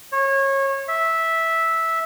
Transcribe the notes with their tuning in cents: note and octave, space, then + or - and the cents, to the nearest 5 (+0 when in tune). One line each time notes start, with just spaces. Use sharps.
C#5 -25
E5 -10